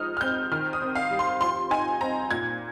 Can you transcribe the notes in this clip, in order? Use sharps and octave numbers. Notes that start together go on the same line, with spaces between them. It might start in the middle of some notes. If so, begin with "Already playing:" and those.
Already playing: F3 G#3 D#4 D#6 F6
F6
C4 G6
D#3 F6
D#6
C4
F5
G3
C6
F3 C6
D#4 G#5
C4 A#5
A#2 G#6